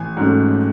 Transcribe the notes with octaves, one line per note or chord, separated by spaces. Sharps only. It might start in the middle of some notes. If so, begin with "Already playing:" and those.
Already playing: A1 G#5
G#2 F#3 A3 C#4